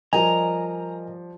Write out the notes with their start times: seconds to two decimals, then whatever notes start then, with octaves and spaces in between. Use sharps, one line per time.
0.13 F3 G3 A#4 D#5 G#5 A#5